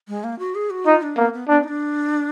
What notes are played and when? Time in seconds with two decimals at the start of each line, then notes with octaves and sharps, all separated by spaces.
0.08 G#3
0.24 A#3
0.39 F#4
0.55 G#4
0.70 F#4
0.86 D#4 F4
1.02 D4
1.17 A#3 B3
1.33 B3
1.48 B3 D4
1.64 D#4
1.68 D4